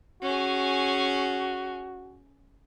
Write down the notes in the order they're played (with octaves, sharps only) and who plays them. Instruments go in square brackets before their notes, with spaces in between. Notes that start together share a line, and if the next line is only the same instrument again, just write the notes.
[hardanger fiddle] C#4 G#4 [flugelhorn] F#4